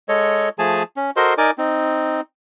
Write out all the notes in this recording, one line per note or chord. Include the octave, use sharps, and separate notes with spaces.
G#3 A4 C#5 D#5
F3 A3 G#4 G#5 A5
C#4
F#4 A4 A#4 C5 D#5 C6
D#4 A#4 D5 G#5 D6
C4 D#4